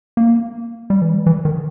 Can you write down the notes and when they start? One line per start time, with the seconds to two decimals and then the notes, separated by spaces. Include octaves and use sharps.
0.17 A#3
0.90 G3
1.02 E3
1.14 G3
1.26 E3
1.45 D#3